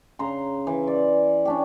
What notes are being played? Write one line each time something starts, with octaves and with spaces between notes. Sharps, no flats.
C#3 A#5 C6
E3
D5
C#4 D4 G4